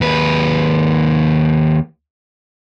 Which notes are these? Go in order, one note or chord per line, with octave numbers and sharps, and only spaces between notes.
D#2 B4